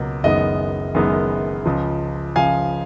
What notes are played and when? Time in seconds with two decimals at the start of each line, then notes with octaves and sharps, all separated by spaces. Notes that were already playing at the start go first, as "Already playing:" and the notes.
Already playing: C#2 B2 F#3 A#3
0.24 F#1 F#2 D#3 G#3 B3 D#5
0.95 F#1 F#2 D#3 G#3 B3
1.66 C#2 C#3 F3
2.36 C#2 C#3 F3 F5 G#5